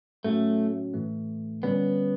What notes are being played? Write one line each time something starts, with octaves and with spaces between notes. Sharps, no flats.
A2 F#3 A3 C#4 F#4
A2 E3 A3
D3 G3 B3 C#4